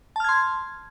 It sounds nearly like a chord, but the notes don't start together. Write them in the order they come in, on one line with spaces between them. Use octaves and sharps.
A5 F6 G#6 C6